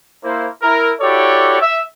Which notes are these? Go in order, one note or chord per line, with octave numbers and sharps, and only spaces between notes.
A#3 E4 C5
E4 A#4
E4 F#4 G4 A4 C#5 D5
E5